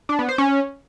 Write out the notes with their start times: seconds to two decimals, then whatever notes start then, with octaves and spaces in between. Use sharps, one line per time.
0.09 D4
0.19 B3
0.29 C5
0.38 C#4